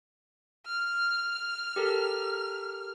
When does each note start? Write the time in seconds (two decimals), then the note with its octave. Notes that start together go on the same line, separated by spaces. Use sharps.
0.66 F6
1.76 G4 A4 A#4